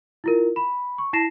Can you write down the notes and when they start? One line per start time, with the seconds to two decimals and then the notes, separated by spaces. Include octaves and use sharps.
0.24 E4 F4 A#4
0.56 B5
0.98 C#6
1.13 E4 A5 A#6 C7 E7